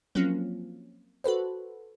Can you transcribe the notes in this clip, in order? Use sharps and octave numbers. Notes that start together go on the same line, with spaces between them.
F3 F#3 A#3 C4 C#4 F4
F#4 A4 B4 C5